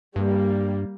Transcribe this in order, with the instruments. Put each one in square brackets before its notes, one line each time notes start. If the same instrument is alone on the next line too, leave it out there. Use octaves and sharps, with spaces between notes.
[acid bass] G2 [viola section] G3 A#3